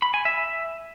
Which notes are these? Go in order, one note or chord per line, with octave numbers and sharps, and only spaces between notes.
B5
G#5
E5